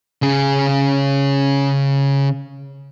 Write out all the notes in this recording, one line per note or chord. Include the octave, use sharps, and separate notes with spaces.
C#3 G#4